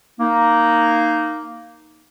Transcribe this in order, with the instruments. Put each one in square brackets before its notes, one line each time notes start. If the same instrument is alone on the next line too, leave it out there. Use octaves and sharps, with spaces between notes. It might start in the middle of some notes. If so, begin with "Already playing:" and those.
[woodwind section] A#3 D#4